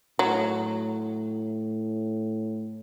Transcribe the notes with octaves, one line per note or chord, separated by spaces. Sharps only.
A2 F#3